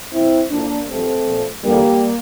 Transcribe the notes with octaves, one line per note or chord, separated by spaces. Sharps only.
A#2 F3 C4 E4
A2 F3 A#3 D4
G2 F3 A3 C4
A#2 F3
E2 D3 F3 G3 A#3